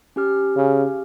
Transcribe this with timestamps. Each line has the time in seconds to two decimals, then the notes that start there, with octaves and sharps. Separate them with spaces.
0.16 C#4 G4 F6
0.56 C#3